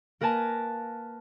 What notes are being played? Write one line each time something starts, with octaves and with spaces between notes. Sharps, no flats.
A#3 A#4 B4 G#5 A5